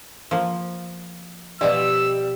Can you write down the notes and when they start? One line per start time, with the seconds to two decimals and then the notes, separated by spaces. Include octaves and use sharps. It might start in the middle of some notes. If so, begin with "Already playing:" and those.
0.31 F3 A#3
1.61 B2 F3 G3 D5 D#5 E6